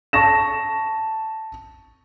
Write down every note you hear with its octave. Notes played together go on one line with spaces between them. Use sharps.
A5 C#6 A#6 E7